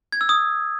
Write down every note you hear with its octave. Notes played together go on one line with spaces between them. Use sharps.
G#6
E6
D#6